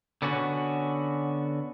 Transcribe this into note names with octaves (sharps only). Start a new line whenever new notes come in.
D3 B3 C#4 F#4